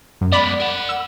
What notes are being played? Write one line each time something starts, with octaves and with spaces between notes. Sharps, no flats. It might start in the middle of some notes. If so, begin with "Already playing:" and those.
F#2
G#3 B3 D5 B5
A#4 F#5
E6